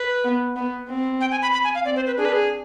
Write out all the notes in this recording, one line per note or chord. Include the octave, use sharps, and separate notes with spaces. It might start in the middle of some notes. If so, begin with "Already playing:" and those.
Already playing: B4
B3
B3
C4
G5
G#5
B5
B5
G#5
F5
C4 D5
C5
B4
D4 G#4
B4
G#4